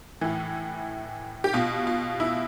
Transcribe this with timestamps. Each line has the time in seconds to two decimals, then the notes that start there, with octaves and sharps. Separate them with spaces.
0.21 A2 E3
1.44 G4
1.54 B2 F4
1.87 F4
2.20 E4